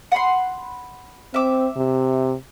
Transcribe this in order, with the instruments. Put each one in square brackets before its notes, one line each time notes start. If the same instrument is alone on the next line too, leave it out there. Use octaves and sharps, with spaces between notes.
[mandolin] F#5 B5 C6
[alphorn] C4 [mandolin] E5 D6
[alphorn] C3